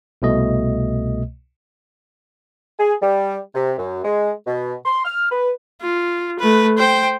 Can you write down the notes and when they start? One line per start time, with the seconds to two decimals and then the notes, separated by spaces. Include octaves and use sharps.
0.22 C2 B2 A3 D#5
2.79 G#4
3.01 G3
3.54 C3
3.78 F#2
4.04 G#3
4.46 B2
4.85 C6
5.05 F6
5.31 B4
5.81 F4
6.39 A3 B4
6.78 C5 G5